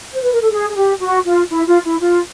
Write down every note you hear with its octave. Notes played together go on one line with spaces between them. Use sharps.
C5
B4
A#4
A4
G#4
G#4
G4
F#4
F4
E4
F4
E4
F4